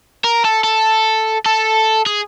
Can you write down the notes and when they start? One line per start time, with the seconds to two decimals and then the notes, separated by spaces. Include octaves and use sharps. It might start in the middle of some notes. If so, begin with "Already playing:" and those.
0.24 A#4
0.45 A4
0.64 A4
1.46 A4
2.06 G#4